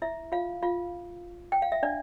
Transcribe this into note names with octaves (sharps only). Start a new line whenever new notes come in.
E4 E5
F4 F5
F4 F5
G5
F5
E5
D4 D5